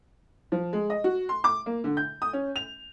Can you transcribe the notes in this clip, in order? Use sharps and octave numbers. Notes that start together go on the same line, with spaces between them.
F3
G#3
D#5
F#4
C6
D6
A#3
D3
G6
D#6
C#4
F7